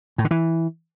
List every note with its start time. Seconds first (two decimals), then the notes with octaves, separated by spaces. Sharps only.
0.18 A2
0.25 D3
0.31 E3